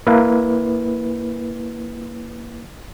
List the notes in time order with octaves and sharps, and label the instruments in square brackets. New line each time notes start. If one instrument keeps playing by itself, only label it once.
[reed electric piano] A#3 E4 B4